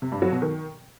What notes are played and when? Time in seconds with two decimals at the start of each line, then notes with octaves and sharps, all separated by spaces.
0.02 C3
0.12 G2
0.22 F#3
0.32 B2
0.42 D#3